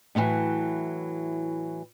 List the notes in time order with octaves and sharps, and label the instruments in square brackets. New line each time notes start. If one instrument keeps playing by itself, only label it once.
[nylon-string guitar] A2 C3 D#3 E3 F#3